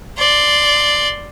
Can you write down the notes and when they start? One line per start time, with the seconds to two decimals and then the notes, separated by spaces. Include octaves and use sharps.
0.18 D5 C6